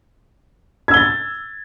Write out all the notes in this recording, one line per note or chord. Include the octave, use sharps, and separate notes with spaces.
E6 G#6 A6 G7